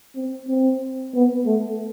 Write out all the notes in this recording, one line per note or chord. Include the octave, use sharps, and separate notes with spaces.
C4
C4
B3
A3